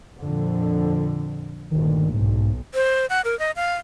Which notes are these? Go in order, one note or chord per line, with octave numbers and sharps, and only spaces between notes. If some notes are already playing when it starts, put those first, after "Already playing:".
F2 A#2 D3
G1 D2 A#2 D#3
B1 G#2
C5
F#5
A#4
D#5
F5